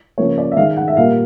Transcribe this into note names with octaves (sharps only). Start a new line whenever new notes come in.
C#3 F3 A#3 C#5
D5
E5
D#3 G#3 F5
F#5
E5
A#2 G3 A#3 F5